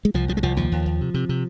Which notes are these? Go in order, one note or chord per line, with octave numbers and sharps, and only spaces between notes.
G#3
C2 F3
C2 F3
G#3
C2 F3
D#2 F3
D#2
D#2
C3
C3
C3